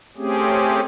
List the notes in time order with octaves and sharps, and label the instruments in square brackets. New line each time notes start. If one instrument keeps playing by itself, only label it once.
[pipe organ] A3 C4 C#4 G4 G#4